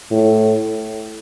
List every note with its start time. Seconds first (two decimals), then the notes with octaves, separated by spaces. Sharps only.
0.11 A2